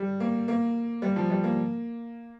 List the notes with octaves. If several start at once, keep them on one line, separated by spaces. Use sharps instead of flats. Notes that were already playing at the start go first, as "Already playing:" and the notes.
Already playing: G3
A#3
A#3
G3
F3
G3
A#3